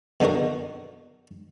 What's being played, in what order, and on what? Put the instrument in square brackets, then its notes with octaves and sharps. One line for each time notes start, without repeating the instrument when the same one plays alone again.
[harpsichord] B2 D3 D#4 F#4 A#4